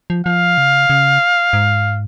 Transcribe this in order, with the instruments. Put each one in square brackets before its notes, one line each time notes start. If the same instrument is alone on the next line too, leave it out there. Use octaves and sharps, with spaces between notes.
[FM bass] F3
[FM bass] F3 [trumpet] F5
[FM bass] C#3
C#3
G#2